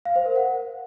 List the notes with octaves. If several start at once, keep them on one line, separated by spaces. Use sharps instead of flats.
F5
C5
A#4
F#5